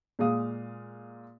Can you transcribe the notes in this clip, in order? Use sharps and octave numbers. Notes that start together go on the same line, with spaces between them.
A#2 G#3 F5 D#6